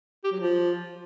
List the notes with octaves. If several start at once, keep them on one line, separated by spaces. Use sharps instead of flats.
G4
F#3
F3